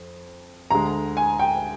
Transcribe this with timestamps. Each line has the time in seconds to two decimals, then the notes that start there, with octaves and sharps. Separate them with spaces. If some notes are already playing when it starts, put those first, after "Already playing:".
Already playing: F2
0.71 D2 D3 G#3 A#5
1.17 G#5
1.39 G5